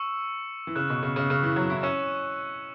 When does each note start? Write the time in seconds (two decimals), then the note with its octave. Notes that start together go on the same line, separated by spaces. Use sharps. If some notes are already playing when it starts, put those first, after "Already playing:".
Already playing: C#6 E6 C#7 E7
0.67 E3
0.76 C#3 F#6 E7
0.90 B2
1.03 C#3
1.16 C#3
1.30 C#3
1.43 E3
1.56 F#3
1.70 E4
1.83 C#4 C#6 E6 C#7 E7